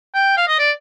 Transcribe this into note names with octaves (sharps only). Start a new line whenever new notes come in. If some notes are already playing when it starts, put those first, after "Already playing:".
G5
F5
D#5
D5